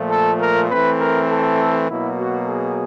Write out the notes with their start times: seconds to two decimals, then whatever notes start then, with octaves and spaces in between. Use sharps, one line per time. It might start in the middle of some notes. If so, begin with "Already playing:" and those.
Already playing: A#2 F3 A3
0.11 A4
0.41 A#4
0.70 E3 A3 C4 B4
1.00 A#4
1.30 A4
1.89 B2 F#3 A#3 E4
2.18 F#4
2.48 G#4